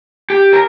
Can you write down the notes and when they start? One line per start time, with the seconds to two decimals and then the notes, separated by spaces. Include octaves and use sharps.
0.30 G4
0.53 A#4